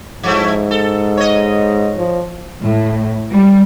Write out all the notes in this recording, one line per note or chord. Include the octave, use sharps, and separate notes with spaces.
G#2 F3 A3 E4
A4
C#5 D#5
F3
A2
G3